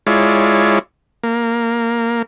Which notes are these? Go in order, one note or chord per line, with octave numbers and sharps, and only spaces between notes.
G#3 E4 F4 C#5 D5
A#3